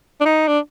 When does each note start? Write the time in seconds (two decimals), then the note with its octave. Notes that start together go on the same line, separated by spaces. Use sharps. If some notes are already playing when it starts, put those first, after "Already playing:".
0.21 D4
0.25 D#4
0.48 D4